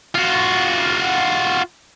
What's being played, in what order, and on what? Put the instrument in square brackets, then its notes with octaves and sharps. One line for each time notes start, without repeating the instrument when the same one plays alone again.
[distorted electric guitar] F4 F#4